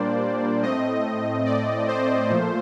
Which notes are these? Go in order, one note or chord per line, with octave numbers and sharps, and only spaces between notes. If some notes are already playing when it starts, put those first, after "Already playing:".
Already playing: A#2 G3 A#3 D4 C5 D5
A2 A3 C4 D#5
D5
C5
A#2 F3 A3